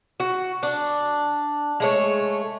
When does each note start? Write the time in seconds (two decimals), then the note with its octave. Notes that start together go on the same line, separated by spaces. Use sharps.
0.20 F#4
0.63 D4
1.80 G#3 A3 C#5